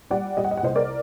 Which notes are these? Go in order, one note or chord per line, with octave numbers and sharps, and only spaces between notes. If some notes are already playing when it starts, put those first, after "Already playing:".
G3 D5 F#5
G3 D#5
F#5
D#5
F#5
C2 C5 D#5
A#4 D5